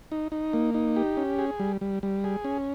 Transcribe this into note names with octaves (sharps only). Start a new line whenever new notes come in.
D#4
D#4
A#3
D#4
G4
C#4
G#4
G3
G3
G3
G#4
C#4